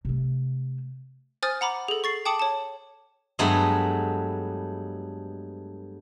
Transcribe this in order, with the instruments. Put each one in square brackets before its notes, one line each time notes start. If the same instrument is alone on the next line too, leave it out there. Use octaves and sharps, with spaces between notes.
[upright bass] C3 A3
[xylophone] C5 G#5 D#6 F6 A6
F#5 A#5 B5 D6
G#4 A4
C#6 A6 C7
G5 A5 D6 D#6 C#7 F#7
C#5 A5
[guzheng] G2 F#3 G#3 A3 B3 A#5